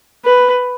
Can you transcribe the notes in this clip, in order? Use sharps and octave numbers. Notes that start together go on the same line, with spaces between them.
B4